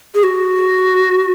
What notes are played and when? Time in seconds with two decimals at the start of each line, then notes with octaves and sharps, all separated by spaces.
0.15 G#4
0.23 F#4